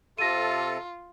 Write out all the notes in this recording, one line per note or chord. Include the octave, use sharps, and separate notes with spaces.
C3 F4 A4 A#6 D#7